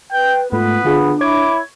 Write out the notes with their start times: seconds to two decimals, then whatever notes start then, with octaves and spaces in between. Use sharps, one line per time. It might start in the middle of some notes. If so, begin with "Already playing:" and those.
0.12 B4 G5 G6
0.52 G#2 A3 B3 F4 B4
0.85 D3 D4 F4 G#4
1.21 E4 C#5 D6 G#6